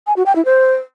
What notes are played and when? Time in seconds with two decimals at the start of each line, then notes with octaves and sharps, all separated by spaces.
0.07 G#5
0.16 F#4
0.26 G5
0.36 E4
0.45 C5